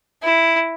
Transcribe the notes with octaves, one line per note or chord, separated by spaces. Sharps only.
E4